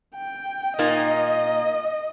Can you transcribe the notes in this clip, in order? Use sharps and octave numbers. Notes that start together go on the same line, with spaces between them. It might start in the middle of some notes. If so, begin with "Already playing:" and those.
G5
A#2 A#3 D#4 D#5